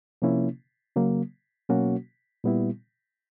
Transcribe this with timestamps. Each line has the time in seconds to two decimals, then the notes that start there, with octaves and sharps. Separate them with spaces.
0.22 C3 F3 A#3 C#4 E4
0.96 C#3 F#3 A#3
1.69 B2 F#3 A#3 C#4 F#4
2.44 A#2 G3 B3 E4